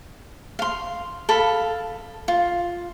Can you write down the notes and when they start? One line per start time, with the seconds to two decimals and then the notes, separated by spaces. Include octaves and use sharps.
0.59 F5 C6
1.29 A4 F5 B5
2.28 F4